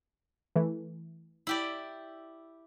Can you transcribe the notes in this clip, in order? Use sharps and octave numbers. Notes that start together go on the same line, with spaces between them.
E3 A3
E4 G4 D5